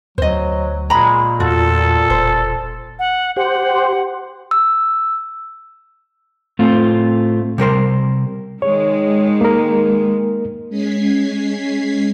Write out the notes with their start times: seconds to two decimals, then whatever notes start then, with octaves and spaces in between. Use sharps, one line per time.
0.18 D2 F#3 C5 D#5
0.90 A#2 G#3 A#5 B5
1.40 E2 F4 F#4 A4
2.10 E1 C5
2.99 F#5
3.36 G4 C5 F#5
4.51 E6
6.59 A2 A3 C4 F4
7.58 C3 G3 A#4 C5
8.62 D#3 G#3 C#5
9.41 A#3 A#4
10.69 G#3 C#4 G#6 B6 C7